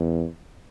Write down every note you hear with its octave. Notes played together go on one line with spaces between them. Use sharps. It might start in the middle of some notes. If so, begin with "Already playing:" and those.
Already playing: E2